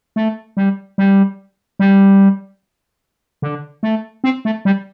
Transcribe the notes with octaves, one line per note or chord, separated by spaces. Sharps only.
A3
G3
G3
G3
D3
A3
C4
A3
G3